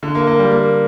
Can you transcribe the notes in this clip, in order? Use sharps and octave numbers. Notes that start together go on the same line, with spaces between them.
D3
A#3
A#3
G3
A#3